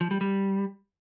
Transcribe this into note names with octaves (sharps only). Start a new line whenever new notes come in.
F3
G3
G3